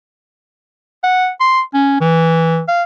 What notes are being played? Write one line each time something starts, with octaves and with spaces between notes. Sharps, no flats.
F#5
C6
C#4
E3
F5